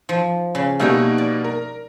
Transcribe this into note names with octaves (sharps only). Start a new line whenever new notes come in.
F3
C#3
B2 G3 A3 A#3 D#4 C#5
D5
A#4